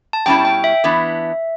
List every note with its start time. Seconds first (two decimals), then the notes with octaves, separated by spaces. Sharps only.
0.13 A5
0.26 B2 G3 C#4 E4 G5
0.45 G5
0.64 E5
0.84 E3 B3 D4